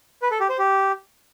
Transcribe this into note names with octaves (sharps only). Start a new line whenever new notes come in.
B4
A4
G4
C5
G4